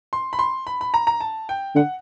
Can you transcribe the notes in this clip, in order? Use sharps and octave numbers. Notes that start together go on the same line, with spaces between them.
C6
B5
C6
B5
B5
A#5
A#5
A5
G5
D3 F#5